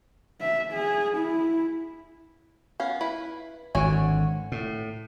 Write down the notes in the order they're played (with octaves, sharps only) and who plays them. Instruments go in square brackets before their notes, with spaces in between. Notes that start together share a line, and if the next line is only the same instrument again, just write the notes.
[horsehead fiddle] E5
G#4
E4
[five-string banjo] B3 C#4 F5
E4 B4
[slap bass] G#1 D3 [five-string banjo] F#4 C#5 G#5
[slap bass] A2